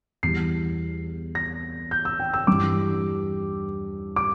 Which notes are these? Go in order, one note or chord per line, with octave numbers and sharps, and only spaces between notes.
E2 E3 G3 C7
A#6
G6
E6
G5
E6
G2 E3 G3 D6
D6